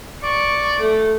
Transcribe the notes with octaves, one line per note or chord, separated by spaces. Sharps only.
D5 C#6
A3